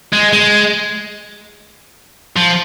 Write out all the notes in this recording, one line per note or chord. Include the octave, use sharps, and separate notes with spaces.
G#3
G#3
F3